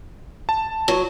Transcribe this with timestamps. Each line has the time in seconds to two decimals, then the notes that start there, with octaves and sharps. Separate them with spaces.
0.49 A5
0.88 F#3